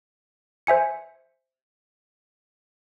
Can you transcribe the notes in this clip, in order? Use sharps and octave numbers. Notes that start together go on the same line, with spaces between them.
C5 E5 G#5 C#7